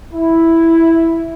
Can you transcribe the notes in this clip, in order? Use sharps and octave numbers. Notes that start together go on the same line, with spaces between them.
E4